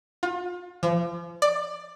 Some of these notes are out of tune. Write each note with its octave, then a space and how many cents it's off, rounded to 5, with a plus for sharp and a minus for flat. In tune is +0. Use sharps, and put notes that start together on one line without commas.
F4 +35
F3 -35
D5 +15